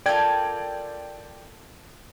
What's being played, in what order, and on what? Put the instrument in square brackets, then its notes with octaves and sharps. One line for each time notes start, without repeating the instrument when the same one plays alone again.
[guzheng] F4 A4 A#4 [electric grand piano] D5 G5 G#6